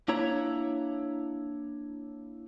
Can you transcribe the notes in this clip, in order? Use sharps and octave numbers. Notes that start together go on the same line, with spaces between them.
A#3 D4 E4 C#5 A#5